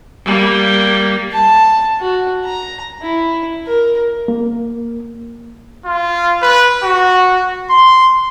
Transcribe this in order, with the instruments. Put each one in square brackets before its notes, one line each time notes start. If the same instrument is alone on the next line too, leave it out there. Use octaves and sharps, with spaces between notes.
[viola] G3 A#3
[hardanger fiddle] A5
F#4
A#5
E4
A#4
[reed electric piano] A#3
[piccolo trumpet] F4
B4
F#4
C6